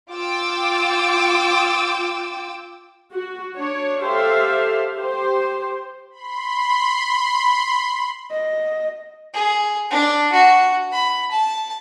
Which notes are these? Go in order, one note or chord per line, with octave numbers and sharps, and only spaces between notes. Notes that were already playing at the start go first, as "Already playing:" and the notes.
F4 G5 D6 E6
F#4
D4 C#5
G4 A4 C5 E5 F5
G4 C5
B5 C6
D#5
G#4
D4
F#4
B5
A5